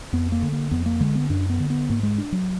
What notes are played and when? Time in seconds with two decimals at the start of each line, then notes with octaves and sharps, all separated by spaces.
0.13 F2 B3
0.32 A#3
0.42 D3
0.52 A#3
0.71 F2 B3
0.86 A#3
1.00 D3 G#3
1.15 B3
1.30 F#2 D4
1.50 B3
1.60 D3
1.70 B3
1.90 G#2 A#3
2.03 G#3
2.18 D4
2.32 F#3